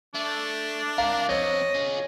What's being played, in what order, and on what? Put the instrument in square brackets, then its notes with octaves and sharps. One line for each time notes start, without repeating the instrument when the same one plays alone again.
[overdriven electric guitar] A3 [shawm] D4
[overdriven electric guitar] C2 A#4 [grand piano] F5
[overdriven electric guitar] F2 C4 [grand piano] C#5 [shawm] D#5
[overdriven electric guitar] F4 G#4